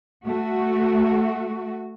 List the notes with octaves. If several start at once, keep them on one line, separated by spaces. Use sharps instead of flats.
A3 F#4